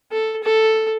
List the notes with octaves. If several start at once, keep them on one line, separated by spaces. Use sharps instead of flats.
A4
A4